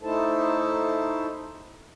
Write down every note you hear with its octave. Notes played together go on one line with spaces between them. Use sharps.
A3 D#4 E4 A4 C5 A5